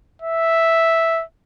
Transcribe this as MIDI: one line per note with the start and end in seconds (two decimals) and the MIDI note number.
0.22 1.23 76